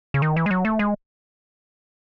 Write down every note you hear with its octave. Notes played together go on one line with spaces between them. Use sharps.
C#3
D#3
E3
G#3
F#3
A3
G#3